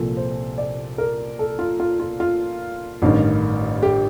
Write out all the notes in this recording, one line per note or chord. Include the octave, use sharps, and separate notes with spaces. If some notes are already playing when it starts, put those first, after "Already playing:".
Already playing: C2 A#2 F3 A4
C5
D5
A#4
A4
F4
F4
F4
F4
A1 G2 D#3
G4